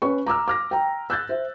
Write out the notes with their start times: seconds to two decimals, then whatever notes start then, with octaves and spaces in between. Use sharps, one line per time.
0.02 C#4 B4 C#6
0.26 A#5 D6 E6 F6
0.48 D6 F6 A#6
0.71 G5 A#5
1.10 E6 F#6 G6 A6
1.29 C5 E5